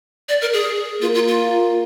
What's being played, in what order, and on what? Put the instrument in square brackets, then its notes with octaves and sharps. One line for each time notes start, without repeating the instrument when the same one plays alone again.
[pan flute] D5
A#4
G#4
[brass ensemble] A#3 [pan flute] F4
[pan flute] F4
F4